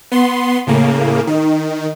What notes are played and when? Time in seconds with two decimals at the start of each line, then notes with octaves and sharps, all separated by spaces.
0.12 B3 C6
0.67 A2 C#3 A#3
1.27 D#3